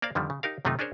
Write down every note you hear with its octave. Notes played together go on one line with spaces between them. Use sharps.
A#3 A#4 C5 D5 F5
F2 D3 D#3 F3 G3
C#3
D#4 G4 A#4 F5
F#2 C3 D#3 A3 D#4 F4
C#4 D4 G#4 A#4 C5 C#5